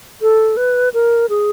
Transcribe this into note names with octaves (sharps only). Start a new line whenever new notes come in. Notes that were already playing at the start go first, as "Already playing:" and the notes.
A4
B4
A#4
G#4